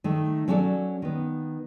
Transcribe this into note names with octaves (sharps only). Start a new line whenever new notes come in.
D#3 A3
F#3 C#4 F#4 A4 D5
D#3 B3